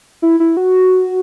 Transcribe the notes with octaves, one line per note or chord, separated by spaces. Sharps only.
E4
E4
F#4